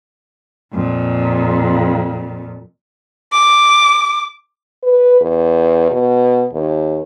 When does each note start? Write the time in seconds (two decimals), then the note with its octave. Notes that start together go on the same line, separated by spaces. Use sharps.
0.74 F2 A#2
3.33 D6
4.83 B4
5.21 E2
5.91 B2
6.52 D#2